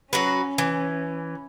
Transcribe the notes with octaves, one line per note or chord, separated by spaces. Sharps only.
F#3 C#4 F#4 B4
E3